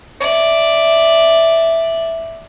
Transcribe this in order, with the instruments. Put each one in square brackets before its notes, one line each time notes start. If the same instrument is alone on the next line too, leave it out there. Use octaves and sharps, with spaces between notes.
[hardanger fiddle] D5 E5